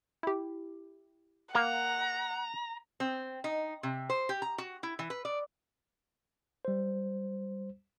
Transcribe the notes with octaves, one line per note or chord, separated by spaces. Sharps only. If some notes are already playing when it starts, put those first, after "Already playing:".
E4 G4
A#3 F#5 A#5
C4
D#4
C3
C5
G4
A#5
F#4
E4
E3
B4
D5
G3 C5